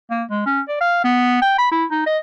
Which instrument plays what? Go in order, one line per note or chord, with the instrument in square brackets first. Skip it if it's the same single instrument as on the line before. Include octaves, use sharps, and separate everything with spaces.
[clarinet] A#3
G#3
C#4
D5
F5
B3
G5
B5
E4
D#4
D#5